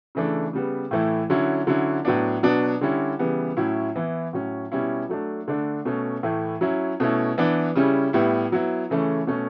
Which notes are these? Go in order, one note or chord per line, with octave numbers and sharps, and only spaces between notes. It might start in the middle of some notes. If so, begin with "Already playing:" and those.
C#3 E3 A3 D4
C#3 G3 B3
A2 E3 A3 E4
D3 F#3 C#4 E4
D3 F#3 C#4 E4
A2 F#3 B3 D4
B2 F#3 B3 D4
D3 G3 C#4 E4
C#3 E3 G3 B3
A2 F#3 C#4 E4
E3 B3 E4
A2 F#3 C#4
B2 G3 C#4 E4
F#3 A3 D4
D3 A3 D4
B2 A3 C#4
A2 E3 A3 E4
F#3 C#4 E4
B2 A3 C#4 E4
E3 B3 D4
C#3 G3 C#4 E4
A2 G3 B3 E4
F#3 B3 E4
C#3 E3 A3 C#4
B2 A3 C#4